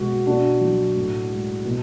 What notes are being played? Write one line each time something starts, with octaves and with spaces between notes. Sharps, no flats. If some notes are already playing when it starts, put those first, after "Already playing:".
Already playing: B2 G#3 F#4
B2 D4 F#4
F#3
A2
G#3
B2